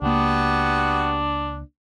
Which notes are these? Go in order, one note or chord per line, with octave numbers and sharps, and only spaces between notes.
C#2 A#3 B3 D4 F#4 G4